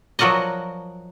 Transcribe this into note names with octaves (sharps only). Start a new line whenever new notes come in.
F3 F#3 F#4 A#4 D5 D#5